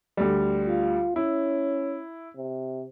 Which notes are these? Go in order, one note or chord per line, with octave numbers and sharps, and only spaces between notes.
D2 G3
F4
C#4 E4
C3